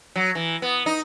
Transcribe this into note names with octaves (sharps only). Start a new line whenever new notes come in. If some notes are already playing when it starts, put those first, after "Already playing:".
F#3
E3
B3
D#4